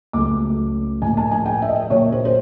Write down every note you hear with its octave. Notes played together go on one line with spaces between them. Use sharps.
C#2 C#3 F#3 A3 D6
A2 F3 A#3 G#5
A5
G#5
G5
E5
D#5
A#2 F#3 A#3 C#5
C5
C5